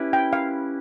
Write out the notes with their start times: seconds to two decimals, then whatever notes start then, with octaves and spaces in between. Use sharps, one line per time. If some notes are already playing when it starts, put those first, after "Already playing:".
Already playing: C#4 E4 G4 B4
0.13 G5
0.33 F5